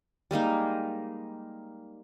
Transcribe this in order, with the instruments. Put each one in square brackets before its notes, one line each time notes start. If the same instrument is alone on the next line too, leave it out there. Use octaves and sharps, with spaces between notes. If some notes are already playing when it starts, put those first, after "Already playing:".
[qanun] G3 G#3 A#3 D#4